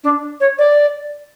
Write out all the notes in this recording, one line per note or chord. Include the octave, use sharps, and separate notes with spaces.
D4
C#5
D5